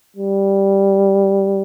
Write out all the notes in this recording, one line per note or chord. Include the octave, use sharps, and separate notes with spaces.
G3